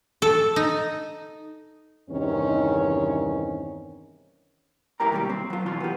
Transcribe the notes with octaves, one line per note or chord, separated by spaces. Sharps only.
A4
D#4
E2 G2 C3 D#3 C4 C#4
F#2 A2 E4 G4 A#4 A#5
D#2 B2 G3 G4
C4
F#3 F4
B1 E3 F4 C6
B3 G4